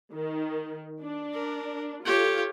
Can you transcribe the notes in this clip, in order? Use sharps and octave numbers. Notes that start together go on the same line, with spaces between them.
D#3
D4
A#4
F4 G4 A4 C#5